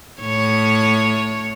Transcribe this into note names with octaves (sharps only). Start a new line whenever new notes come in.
A2 C#5